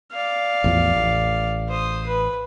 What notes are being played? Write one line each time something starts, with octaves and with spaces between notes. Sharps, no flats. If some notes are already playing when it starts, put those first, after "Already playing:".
D5 F5
A1 E2 F3
A1
C5 D#6
B4